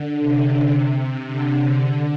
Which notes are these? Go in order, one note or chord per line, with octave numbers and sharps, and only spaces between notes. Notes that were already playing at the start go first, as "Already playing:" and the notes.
Already playing: D3
C3
C3
D3
D3